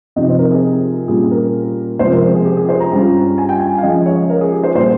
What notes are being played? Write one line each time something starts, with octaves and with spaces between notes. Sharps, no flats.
C3 F3 C4 D#4 D#5
C5
A#4
G#4
A#2 G3 C#4 F4 G#4
A#4
C#2 C3 F3 C5
A#4
G#4
G#4
G4
G#4
C5
A#5
G2 G3 C#4 F4
G#5
G5
G#5
F5
C#3 F3 G#3 D#5
C#5
A#4
G#4
G4
C5
A#2 G3 C5